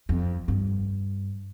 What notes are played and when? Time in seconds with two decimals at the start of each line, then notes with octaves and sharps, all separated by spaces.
0.09 F2
0.48 G2